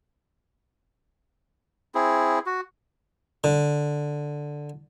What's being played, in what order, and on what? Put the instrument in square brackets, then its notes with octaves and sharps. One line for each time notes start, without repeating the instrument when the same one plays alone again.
[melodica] C4 E4 G#4
F#4
[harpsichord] D3